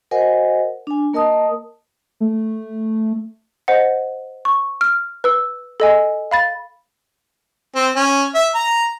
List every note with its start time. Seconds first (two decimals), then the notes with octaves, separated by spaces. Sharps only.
0.11 F#4 A#4 C5 D#5 F#5 G#5
0.87 D4 G#5
1.13 A#3 A#4 D#5 A5 D#6
2.21 A3
3.68 C5 D#5 F#5
4.45 C#6
4.81 F6
5.24 B4 E6
5.80 A4 D#5 G#5
6.31 F5 B5 A6
7.76 C4
7.96 C#4
8.35 E5
8.55 A#5